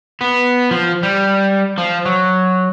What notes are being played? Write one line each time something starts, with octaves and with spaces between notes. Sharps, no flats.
B3
F3
G3
F3
F#3